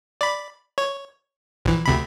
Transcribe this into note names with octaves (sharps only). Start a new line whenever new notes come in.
D5 B5
C#5
A#1 E3
D2 C3 B5